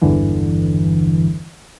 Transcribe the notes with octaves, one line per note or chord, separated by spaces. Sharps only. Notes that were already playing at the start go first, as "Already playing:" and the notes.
G#1 E2 G2 D3 E3